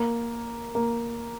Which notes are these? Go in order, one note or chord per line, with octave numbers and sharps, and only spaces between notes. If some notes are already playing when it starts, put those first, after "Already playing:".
Already playing: A#3
A#3